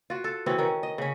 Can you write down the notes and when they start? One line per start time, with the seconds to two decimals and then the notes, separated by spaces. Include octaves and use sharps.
0.10 F4 F#4
0.24 A4
0.46 B2 E3 C4 C#4
0.59 D#3 C#4
0.83 D#5
0.98 C#3 C#4